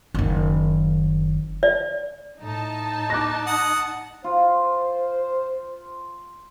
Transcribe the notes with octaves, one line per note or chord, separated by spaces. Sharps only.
F#1 D#3
D5
A2 D#4 A5
D6 F#6 A#6
F#5 D#6
F4 C5